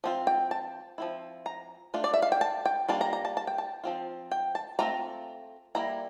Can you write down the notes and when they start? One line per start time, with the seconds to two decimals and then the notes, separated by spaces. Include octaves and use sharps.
0.04 F3 C4 F4
0.27 G5
0.51 A5
0.98 F3 C4 E4
1.46 A#5
1.94 A3 D4 F4
2.04 D5
2.14 E5
2.22 F5
2.32 G5
2.41 A5
2.65 G5
2.88 G3 A#3 D4 F4 A5
3.01 A#5
3.13 A#5
3.25 A5
3.37 A5
3.47 G5
3.58 A5
3.84 F3 C4 F4
4.31 G5
4.55 A5
4.79 A3 C4 F4 A#5
5.75 G3 A#3 E4 A#5